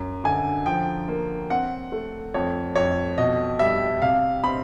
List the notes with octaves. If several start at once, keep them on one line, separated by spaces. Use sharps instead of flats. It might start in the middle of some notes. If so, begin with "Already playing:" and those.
Already playing: F#2
D3 G#5
F3 G5
A#3
C4 F#5
A3
F2 C#5
F2 C#5
B2 D#5
G3 E5
C3 F5
C4 B5